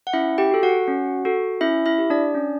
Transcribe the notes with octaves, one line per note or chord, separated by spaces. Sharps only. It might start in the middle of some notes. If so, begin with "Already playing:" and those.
F#5
C#4 E4 E5
G4 G5
F#4 A4
F#4 F#5
C#4
F#4 A4
C#4 E4 E5
E4 E5
G4
D4 D5
C#4